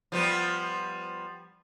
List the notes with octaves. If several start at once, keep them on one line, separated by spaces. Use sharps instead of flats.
F3 G3 B3